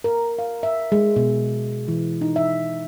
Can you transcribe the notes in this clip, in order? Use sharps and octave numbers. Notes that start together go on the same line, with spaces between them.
A#4
F5
E5
G#3
B2
E3
D#4
E5